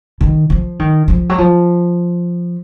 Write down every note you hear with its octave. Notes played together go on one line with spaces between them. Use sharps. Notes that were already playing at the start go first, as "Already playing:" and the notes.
D#3
F3
D#3
F3
F#3
F3